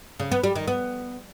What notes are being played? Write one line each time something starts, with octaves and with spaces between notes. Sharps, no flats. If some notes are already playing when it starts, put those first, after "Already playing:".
C#3
B3
G3
D#3
B3